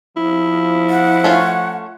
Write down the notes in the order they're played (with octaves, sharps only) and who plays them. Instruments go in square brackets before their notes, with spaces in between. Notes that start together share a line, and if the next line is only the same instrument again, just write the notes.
[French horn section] F3 [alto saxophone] E4
[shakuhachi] F#5
[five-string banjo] A3 C#4 F4